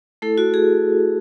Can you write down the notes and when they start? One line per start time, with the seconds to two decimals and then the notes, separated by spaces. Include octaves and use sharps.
0.22 A3 E4 A4
0.38 F#4
0.54 G#4